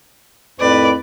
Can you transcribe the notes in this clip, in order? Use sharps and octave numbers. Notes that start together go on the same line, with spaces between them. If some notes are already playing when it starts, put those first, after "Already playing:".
F2 A2 D#3 B4 D5